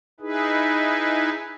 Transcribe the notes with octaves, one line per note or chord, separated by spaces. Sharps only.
D#4 E4 G#4 B4